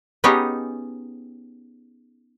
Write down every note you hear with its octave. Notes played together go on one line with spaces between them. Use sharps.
B3 C#4 D#4 G4 G#4 C#5